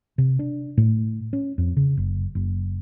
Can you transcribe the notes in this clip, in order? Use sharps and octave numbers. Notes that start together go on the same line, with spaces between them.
C3
D4
A2
C#4
F2
C#3
F#1
F#1